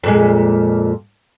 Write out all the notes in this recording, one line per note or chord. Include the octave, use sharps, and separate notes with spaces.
F2 A#2 G#3